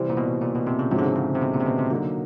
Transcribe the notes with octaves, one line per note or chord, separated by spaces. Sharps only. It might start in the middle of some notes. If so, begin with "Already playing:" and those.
Already playing: C3 E3 G3 C4
A#2
B2
A#2
B2
C3
C#3
G#2 C3 F3 G#3 C#4 F#4
D3
C#3
C#3
C3
B2
A#2
C3
B2
C3
D3 F#3 A#3 D#4 F#4